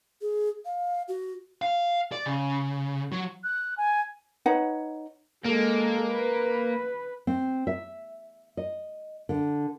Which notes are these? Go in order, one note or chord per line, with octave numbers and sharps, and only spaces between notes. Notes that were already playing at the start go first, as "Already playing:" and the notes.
G#4
F5
F#4
F5
D5
C#3
F#3
F#6
G#5
D#4 B4 C#5 F#5
G#3 A#3 A4
B4
C4
E5
D#5
D3